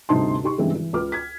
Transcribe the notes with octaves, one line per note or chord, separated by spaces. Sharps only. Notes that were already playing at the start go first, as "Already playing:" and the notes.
G1 D2 C3 D#4 A5 C6
D#4 G4 C6 C#6
G2 C#3 E3 G3 G#3 C4
E3
C#2 B4 D6 F6
G#6 B6